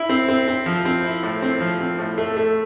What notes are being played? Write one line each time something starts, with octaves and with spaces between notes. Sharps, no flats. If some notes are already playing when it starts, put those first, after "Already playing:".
Already playing: E4
C4
C4
C4
F3
C4
E4
A2
C4
F3
C4
A2
A3
A3